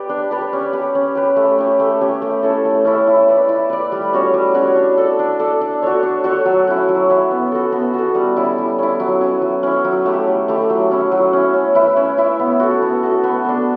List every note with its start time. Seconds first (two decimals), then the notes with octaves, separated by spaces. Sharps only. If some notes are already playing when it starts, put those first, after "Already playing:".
Already playing: G4 B4 D5
0.09 D4
0.31 G4 B4 D5
0.53 C#4
0.73 G4 B4
0.95 C#4
1.15 G4 B4
1.36 A3
1.58 C#4 G4
1.80 A3
2.01 C#4 G4
2.22 A3
2.43 C#4 E4 A4
2.65 A3
2.85 C#4 E4 A4
3.07 E4
3.28 B4 D5
3.49 E4
3.70 B4 D5
3.92 G3
4.13 C#4 F#4 C#5
4.34 G3
4.54 C#4 F#4 C#5
4.76 D4
4.97 A4 D5
5.19 D4
5.39 A4 D5
5.61 D4
5.82 F#4 A4 C#5
6.03 D4
6.24 F#4 A4 C#5
6.45 F#3
6.67 C#4 E4
6.88 F#3
7.09 C#4 E4
7.31 B3
7.52 F#4 A4
7.72 B3
7.94 F#4 A4
8.15 G3
8.37 C#4 E4
8.58 G3
8.79 C#4 E4
9.00 F#3
9.21 C#4 E4
9.42 F#3
9.63 C#4 E4
9.84 F#3
10.06 A3 E4 G4
10.27 F#3
10.48 A3 E4 G4
10.70 F#3
10.91 C#4 E4
11.12 F#3
11.33 C#4 E4
11.54 C#4
11.75 E4 B4 E5
11.96 C#4
12.18 E4 B4 E5
12.39 B3
12.60 F#4 A4
12.82 B3
13.03 F#4 A4
13.24 B3
13.45 D4 A4